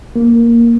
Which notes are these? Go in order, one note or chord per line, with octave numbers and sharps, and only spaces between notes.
A#3